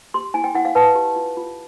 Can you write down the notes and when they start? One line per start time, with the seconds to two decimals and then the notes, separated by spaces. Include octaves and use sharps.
0.14 G4 C6
0.34 E4 G#5
0.44 G5
0.55 E4 F#5
0.65 F5
0.75 B4 A5
0.95 G4
1.16 F4
1.37 F4